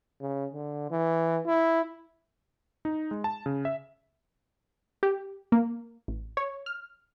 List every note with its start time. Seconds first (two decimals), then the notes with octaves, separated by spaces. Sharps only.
0.21 C#3
0.53 D3
0.91 E3
1.47 E4
2.85 D#4
3.11 G#3
3.24 A5
3.46 C#3
3.65 E5
5.03 G4
5.52 A#3
6.08 A1
6.37 C#5
6.66 F6